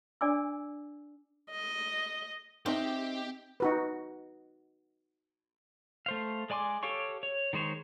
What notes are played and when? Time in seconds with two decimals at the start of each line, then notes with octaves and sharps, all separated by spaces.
0.21 D4 D5 G#5 D6 E6
1.51 D#5
2.66 C4 D#4 G4 D#5 E5 G5
3.60 D#4 F#4 B4
6.06 A3 C5 F5
6.50 G#3 D5 G#5 C6 D6
6.83 G4 A4 C#5 F5 C#6
7.23 C#5
7.53 D#3 G#3 C5 C#5